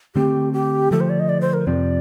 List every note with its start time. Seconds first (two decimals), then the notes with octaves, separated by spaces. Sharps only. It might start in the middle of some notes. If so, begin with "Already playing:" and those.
0.15 D3 A3 C4 G4
0.53 G4
0.91 D3 F3 A3 A4
1.00 C5
1.09 D5
1.20 D#5
1.29 D5
1.41 C5
1.54 A#4
1.67 F2 C3 F3 C4 D5